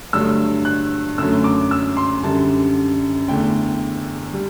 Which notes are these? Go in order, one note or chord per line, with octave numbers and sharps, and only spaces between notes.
G2 D3 F#3 A3 E6
F#6
F#2 D3 F#3 A3 E6
D6
E6
C6
F#2 D3 G3 A5
E2 D3 A3 G5
G3